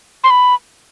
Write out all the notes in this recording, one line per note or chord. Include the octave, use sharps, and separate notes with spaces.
C6
B5